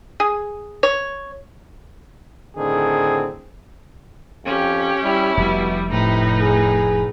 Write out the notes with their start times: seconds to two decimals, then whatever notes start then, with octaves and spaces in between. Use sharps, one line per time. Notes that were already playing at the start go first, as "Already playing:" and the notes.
0.20 G#4
0.83 C#5
2.57 A2 D3 D#3 C4 G#4
4.45 F2 C#4 G4
5.03 G3 E4
5.37 F1 B2 G3
5.92 A2 C3 D#4 B4
6.42 G#4